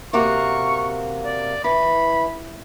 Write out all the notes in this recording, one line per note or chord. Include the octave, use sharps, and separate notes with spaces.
C3 A#3 F#4 C#6
D5
E3 B5